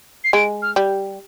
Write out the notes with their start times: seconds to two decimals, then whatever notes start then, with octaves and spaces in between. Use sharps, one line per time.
0.24 C7
0.33 G#3 D7
0.62 F6
0.76 G3